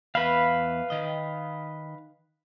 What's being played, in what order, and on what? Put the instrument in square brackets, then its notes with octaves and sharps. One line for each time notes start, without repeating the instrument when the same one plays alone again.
[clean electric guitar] E2 E5 B5 [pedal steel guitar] B4 F5
[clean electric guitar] D#3 D#5